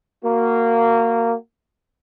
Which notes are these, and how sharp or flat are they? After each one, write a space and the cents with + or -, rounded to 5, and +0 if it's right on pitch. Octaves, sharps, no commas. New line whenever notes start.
A#3 -15 F#4 +0